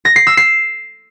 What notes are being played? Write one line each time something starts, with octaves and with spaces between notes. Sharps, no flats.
A#6
C7
E6
C7